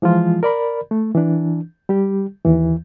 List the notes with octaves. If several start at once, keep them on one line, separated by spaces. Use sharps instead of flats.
E3 F3 G#3 F4
A#4 D5 B5
A3
E3 D4
G3 G4
D#2 E3